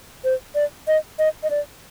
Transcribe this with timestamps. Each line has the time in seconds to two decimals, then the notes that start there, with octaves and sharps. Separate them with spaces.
0.24 C5
0.55 D5
0.88 D#5
1.19 D#5
1.43 D#5
1.50 D5